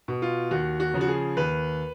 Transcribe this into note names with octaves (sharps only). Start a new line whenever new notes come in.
B2
F4
D#2 F#4
F#4
C#3 F3
F#4
G#4
D#2 B4